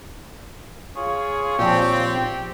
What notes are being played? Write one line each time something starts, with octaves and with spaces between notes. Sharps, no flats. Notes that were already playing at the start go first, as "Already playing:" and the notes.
F4 G#4 C#5
A#2 F3 C4 G4